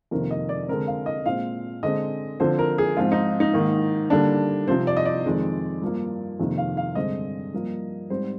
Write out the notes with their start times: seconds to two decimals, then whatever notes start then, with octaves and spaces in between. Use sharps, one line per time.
0.11 F2 C3 D#3 A#3 A#4
0.31 D#5
0.49 D5
0.68 D3 G#3 C4 A#4
0.87 F5
1.06 D#5
1.26 A#2 G#3 C4 F5
1.83 D3 G#3 C4 D#5
2.40 D3 F3 C4 C5
2.59 A#4
2.78 G#4
2.97 G#2 F3 C4 F4
3.12 D#4
3.40 D#4
3.54 G#2 D#3 A#3
4.10 D3 G3 A#3 D4
4.68 C3 F3 C4 C5
4.87 D5
4.97 D#5
5.05 D5
5.25 F2 D#3 G#3 C4
5.82 G2 F3 A#3
6.40 F2 C3 D#3 A#3
6.58 F5
6.77 F5
6.95 G2 D3 G#3 C4 D#5
7.53 G2 F3 A#3
8.10 G#2 G3 C4 C5